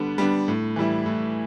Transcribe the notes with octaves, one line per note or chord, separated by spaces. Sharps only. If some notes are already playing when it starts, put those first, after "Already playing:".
Already playing: D3 G3 B3 D4
G3 B3 D4
A2
E3 G3 E4
A2